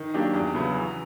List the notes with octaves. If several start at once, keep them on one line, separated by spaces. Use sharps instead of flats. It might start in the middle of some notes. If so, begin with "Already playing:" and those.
Already playing: D#3
F#3 A#3 D4 G4
E2
C#3 F#3 B3 E4
E3